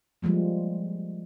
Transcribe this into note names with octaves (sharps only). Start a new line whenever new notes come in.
F3 G3 G#3 A#3